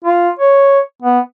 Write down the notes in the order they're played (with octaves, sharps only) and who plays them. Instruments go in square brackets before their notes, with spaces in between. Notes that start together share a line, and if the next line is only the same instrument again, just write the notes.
[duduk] F4
C#5
B3